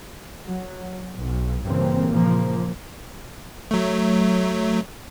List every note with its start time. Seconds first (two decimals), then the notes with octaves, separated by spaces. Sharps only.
0.47 F#3
1.18 B1
1.63 G2 A#2 C#3 E3 A#3 C4
2.11 A#2 C#3 F3 A#3
3.71 F#3 A3